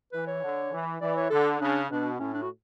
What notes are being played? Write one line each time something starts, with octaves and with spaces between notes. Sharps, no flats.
E3 B4
C#5
D3
E3
E3 D5
C#5
D3 A4
C#3 D4
B2 D4
A2 C#4
D4
F#4